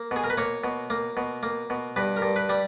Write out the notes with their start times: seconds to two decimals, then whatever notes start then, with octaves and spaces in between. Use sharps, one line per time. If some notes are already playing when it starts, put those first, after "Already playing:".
Already playing: A#3
0.11 B2 G#4
0.24 A#4
0.30 B4
0.37 A#3 C#5
0.64 B2
0.90 A#3
1.17 B2
1.43 A#3
1.70 B2
1.96 G2 B4
2.16 A#4
2.22 G2
2.36 B4
2.49 G3